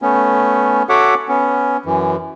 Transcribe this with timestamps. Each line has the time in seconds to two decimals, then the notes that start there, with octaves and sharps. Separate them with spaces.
0.02 A3 B3 C#4
0.89 F#4 A4 C#5 E5 F#5 D6
1.28 B3 C#4
1.86 F#2 E3